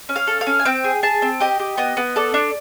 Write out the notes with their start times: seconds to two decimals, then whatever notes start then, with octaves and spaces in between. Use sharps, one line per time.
0.09 C#4
0.16 F5
0.27 A4
0.41 F5
0.47 C#4
0.60 G#5
0.65 C4 G5
0.84 G#4
1.03 G#4 A5
1.22 C4
1.40 G4 D#5
1.60 G4
1.78 B3 D#5
1.97 B3
2.16 A4 D5
2.34 D4